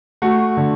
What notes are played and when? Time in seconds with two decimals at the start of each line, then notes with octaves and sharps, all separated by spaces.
0.22 A3 F#4
0.57 D3